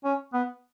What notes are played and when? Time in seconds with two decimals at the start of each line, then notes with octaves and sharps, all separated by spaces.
0.04 C#4
0.33 B3